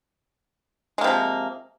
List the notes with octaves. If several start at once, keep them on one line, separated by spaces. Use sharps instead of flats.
C3 F3 G#3 A#3